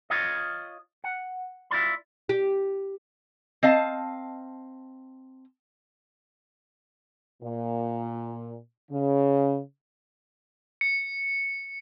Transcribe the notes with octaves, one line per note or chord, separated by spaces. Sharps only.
F4 C#5 D#5
F#5
E4 F4 D5 B5
G4
C4 D#5 F5 A5
A#2
C#3
C#7